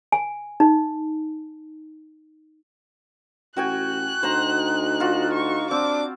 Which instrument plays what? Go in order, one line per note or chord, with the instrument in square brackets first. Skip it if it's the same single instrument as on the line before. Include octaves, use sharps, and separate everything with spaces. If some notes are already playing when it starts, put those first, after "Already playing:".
[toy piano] G#5
D#4
[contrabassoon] A1 [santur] F#4 G5 G#5 [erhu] F#6
[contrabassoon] D2 [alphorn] D#4 [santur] C5 A#5
[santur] F4 F#4
[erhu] C#6
[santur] C4 [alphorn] D4 [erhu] D6